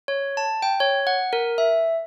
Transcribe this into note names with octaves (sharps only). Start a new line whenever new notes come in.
C#5
A5
G5
C#5
F#5
A#4
E5